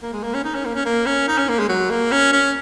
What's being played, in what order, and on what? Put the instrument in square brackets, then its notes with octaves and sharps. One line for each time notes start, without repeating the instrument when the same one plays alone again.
[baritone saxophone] A#3
G#3
A#3
C#4
D#4
C#4
A#3
C#4
A#3
C#4
D#4
C#4
A#3
G#3
F#3
A#3
C#4
C#4